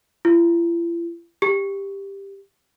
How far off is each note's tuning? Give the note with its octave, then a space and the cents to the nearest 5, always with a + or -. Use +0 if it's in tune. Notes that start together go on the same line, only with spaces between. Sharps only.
E4 +45
G4 +10